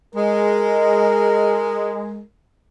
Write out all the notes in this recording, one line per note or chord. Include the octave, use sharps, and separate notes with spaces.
G#3 A#4